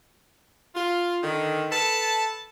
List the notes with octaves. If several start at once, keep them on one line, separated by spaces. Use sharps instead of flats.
F4
D3 D#3
A4 B4 A5